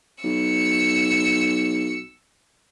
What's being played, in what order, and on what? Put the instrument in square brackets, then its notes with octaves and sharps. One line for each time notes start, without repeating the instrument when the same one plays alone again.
[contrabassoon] B1 [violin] E6 C#7